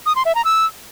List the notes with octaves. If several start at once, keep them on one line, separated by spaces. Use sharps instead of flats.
D#6
C6
E5
A#5
E6